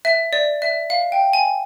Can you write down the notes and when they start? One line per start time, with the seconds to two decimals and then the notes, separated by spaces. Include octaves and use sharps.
0.05 E5
0.33 D5
0.62 E5
0.90 F5
1.12 G5
1.33 G#5